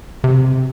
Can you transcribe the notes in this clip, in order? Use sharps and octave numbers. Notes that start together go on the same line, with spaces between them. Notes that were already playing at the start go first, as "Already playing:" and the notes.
C3